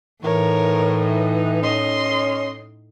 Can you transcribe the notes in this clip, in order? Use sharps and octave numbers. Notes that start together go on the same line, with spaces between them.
A2 E3 D#4 A#4 C#5
C#4 D#5 C6